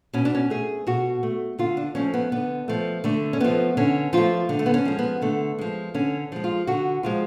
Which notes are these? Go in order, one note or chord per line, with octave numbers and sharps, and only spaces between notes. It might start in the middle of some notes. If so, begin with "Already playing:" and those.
B2 C#4
D4
C#4
A3 G#4
B2 F#4
A3
D3 F4
D4
F3 A3 C#4
B3
D3 B3
F3 A3
D3 A3
C#4
F3 A3 B3
D3 C#4
F3 A3 F4
D3
A3
B3
C#4
F3 G#3
B3
D3 A3
F3 G#3
D3 C#4
F3 G#3
F4
D3 F#4
F3 G#3 F4